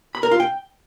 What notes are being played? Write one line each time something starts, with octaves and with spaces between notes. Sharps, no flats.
B5
A#4
F4
G5